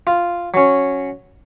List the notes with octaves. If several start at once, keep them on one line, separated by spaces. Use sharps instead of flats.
F4
F#3 C#4